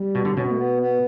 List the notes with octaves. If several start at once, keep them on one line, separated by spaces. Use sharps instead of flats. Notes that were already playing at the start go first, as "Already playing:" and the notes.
Already playing: G3
B2
D3
B2 C#4
B3
A3
B3
B3